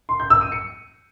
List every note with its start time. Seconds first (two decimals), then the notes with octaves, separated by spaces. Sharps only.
0.09 C6
0.20 G6
0.30 E6
0.41 D#7
0.52 C#7